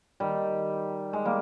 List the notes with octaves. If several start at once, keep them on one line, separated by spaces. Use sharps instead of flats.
D#3 G3
G#3
G3 A#3